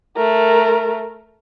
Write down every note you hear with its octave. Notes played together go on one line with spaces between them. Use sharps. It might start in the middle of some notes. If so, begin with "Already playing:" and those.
A3 A#4